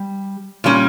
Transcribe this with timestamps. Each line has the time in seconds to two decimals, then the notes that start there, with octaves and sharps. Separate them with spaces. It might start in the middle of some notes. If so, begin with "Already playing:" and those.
Already playing: G3
0.64 A#2 G3 C#4